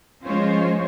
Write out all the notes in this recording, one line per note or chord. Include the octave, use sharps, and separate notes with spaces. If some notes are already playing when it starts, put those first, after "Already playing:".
F3 G#3 C#4 F4 C5 C#5